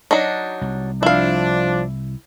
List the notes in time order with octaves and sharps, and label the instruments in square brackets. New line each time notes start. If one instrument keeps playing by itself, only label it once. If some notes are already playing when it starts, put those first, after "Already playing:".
[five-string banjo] F#3 D4 D#4
[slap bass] C2
[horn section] F3 D4 [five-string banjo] E4 F5